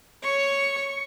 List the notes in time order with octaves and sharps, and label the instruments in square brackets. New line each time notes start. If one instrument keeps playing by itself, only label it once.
[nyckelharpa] C#5 [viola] C#6